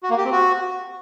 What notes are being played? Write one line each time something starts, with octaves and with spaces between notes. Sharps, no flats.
F#4
A#3
G4
C4
F#4